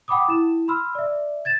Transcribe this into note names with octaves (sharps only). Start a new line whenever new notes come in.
F#5 G5 B5 D6 D#6
E4 E7
B5 C6 E6 F6
D5 E5
G#6 A6 E7